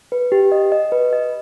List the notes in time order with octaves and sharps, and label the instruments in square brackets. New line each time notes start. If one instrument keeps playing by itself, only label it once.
[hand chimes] B4
G4
D#5
D#5
B4
D#5